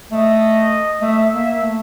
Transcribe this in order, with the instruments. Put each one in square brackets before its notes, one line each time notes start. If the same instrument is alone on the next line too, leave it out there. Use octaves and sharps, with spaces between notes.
[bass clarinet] A3 [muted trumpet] D#5
[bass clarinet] A3 [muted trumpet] E5
[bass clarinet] A#3 [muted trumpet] E5
[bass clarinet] A3